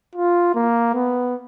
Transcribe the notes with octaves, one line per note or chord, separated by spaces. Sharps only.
F4
A#3
B3